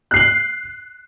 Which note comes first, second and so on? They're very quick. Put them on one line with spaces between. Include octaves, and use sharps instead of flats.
F#6 C7 F#7